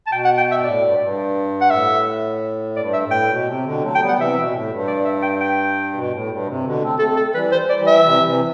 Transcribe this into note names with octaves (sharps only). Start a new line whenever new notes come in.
A5
B2 G5
F#5
G5
E5
G2
A2 D5
G2
G2
F#5
A2 E5
G2 D5
E5
A2
G5
B2
C3
B2 D3
F#3 A3
G5
G3 B3
F#5
C3 E3 E5
B2
A2
G2
D5
E5
G5
G5
B2
A2
G2
C3
B2 D3
A3 C4
A3 C4 A4
A4
E3 G3 B4
C5
D5
E3 G3
E5
C3 E3
C3 E3